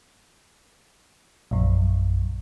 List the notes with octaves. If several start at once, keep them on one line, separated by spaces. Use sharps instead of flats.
A#1 F#2